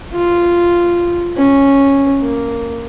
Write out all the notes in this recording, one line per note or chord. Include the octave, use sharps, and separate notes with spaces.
F4
C#4
A#3